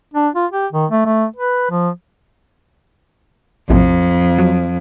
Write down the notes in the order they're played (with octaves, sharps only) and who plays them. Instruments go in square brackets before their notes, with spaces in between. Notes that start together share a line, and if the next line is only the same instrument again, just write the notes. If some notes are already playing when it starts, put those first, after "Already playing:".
[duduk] D4
F4
G4
D#3
A3
A3
B4
F3
[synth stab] A#1 A2 C3 [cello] F2
[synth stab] F#3